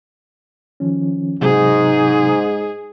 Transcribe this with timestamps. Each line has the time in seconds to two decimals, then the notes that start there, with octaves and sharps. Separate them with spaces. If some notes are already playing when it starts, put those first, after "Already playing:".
0.80 D#3 F3 C#4
1.41 G#2 C3 F#3 D#4 G#4